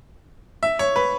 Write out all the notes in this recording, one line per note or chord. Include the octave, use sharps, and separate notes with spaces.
E5
C#5
B4